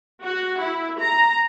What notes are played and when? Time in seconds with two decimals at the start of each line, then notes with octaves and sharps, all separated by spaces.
0.23 F#4
0.60 E4
1.00 A#5